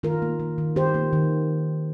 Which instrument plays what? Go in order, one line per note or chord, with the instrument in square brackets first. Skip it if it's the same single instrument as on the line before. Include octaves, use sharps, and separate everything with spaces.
[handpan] D#3 F4 A#4
A#3
A#3
D#3
D#3 G4 C5
A#3
D#3